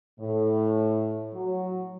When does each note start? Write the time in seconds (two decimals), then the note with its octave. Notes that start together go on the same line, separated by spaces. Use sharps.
0.20 A2
1.34 F#3